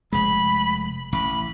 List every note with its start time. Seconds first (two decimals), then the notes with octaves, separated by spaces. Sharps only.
0.13 F1 G#3 B5
1.13 A1 B5